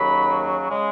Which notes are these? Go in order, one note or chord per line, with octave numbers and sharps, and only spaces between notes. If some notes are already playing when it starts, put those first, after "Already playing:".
Already playing: D#2 C#3 F#3 B5
C#3 G#3